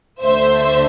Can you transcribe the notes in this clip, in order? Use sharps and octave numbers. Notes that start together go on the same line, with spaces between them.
D2 D3 A3 C5 E5